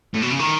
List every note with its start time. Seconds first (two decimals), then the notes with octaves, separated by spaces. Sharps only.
0.14 A2
0.22 B2
0.31 C#3
0.39 D#3